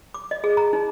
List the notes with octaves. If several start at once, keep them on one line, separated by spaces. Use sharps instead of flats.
D6
D#5
G#4
A#5
D#4